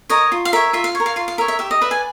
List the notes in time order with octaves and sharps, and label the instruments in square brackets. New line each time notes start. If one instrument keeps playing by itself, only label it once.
[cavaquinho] A#4 C#5 D#5
F4
F5
A#4 C#5 E5
F4 E5
F5
C#5
A#4
F5
F4 F5
F5
A#4 E5
C#5
E5
G4 E5
D#5
B4 D5 E5
G#5